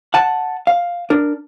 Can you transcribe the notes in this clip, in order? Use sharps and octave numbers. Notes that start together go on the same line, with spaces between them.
F#5 A5
F5
D4 A#4